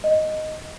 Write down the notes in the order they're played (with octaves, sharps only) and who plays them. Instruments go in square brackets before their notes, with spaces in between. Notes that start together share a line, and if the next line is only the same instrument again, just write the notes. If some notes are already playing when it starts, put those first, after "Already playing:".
[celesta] D#5